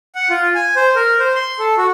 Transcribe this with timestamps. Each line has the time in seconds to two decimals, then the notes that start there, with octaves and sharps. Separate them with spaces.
0.15 F#5
0.30 F4
0.55 G#5
0.76 C5
0.96 A#4
1.19 C5
1.36 C6
1.59 A4
1.78 F#4